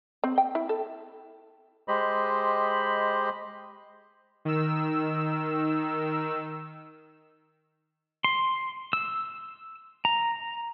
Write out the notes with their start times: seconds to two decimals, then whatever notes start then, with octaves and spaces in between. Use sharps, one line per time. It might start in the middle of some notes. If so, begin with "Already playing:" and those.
0.24 C4
0.38 G5
0.55 E4
0.69 A4
1.88 G#3 G4 C5 D#5 B5
4.45 D#3 E6
8.24 C6
8.93 E6
10.05 A#5